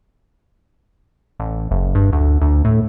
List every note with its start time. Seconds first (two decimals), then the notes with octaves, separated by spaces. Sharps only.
1.40 A1
1.71 F#1
1.95 G2
2.13 D2
2.42 D2
2.65 A2